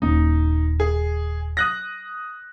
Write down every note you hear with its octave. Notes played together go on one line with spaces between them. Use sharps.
D#1 A#3 C#4 D#4
G#4
D#6 F#6 A#6